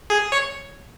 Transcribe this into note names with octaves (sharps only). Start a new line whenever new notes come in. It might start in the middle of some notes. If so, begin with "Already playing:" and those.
G#4
C#5